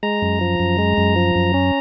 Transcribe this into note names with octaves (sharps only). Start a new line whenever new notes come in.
G#3 A#5
F#2
F3
F#2
G#3
F#2
F3
F#2
C#4